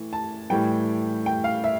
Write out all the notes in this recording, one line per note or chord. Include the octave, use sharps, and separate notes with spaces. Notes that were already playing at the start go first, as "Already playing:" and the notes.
Already playing: A2 E3
A5
A2 E3 G3 G5
G5
F5
E5